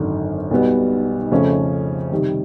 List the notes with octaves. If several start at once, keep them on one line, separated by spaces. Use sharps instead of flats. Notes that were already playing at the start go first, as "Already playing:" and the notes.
Already playing: G#1 F#2 D3
B1 B2 G3 B3
F2 C#3 F3 A3 C#4
C3 D#3 G3